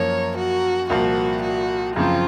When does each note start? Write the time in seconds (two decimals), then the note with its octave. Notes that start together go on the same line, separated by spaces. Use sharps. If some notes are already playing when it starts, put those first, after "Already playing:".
Already playing: F#2 F3 A#3 C#5
0.37 F#4
0.90 C2 A#2 F3 A#3 F4 F#4
1.42 F#4
1.96 F#2 C#3 F3 C4 F4